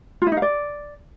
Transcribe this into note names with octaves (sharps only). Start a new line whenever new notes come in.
F4
E4
D#4
F5
D5